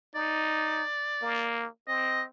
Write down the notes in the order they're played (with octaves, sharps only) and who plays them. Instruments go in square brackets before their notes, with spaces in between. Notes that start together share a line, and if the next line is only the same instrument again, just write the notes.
[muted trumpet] D#4 [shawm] D5
[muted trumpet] A#3
[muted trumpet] C4 [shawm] D#5